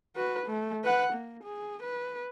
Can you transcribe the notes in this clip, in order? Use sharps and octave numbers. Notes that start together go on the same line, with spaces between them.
F#4 B4
A3
B4 F#5
A#3
G#4
B4